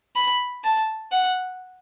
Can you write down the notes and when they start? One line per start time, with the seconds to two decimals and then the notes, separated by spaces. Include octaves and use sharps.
0.16 B5
0.64 A5
1.12 F#5